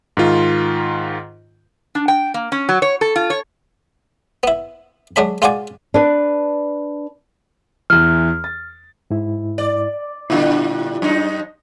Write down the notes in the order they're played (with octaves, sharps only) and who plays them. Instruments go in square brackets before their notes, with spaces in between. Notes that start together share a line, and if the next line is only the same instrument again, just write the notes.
[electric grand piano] G#2 D#3 F4
[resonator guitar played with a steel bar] D4
G5
A#3
C#4
F#3
C#5
A4
F4
C#5
[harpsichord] B3 E4
F#3 G#3 D4 B5
G#3 F4 F#4 D5 G#5
[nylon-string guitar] D4 B4
[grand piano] E2 E3 [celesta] F6
[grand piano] A6
[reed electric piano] G#2 E4
[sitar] D5
[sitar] A#2 D3 G3 [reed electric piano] E4 F4
[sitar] F#2 D#4